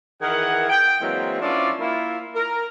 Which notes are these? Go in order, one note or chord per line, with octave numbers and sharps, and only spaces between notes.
D#3 E3 G#4 A#4 F#5
G5
E3 F#3 G#3 A#3 C4
F3 C#4 D4 E4 F4 D5
A#3 E4 F4
A#4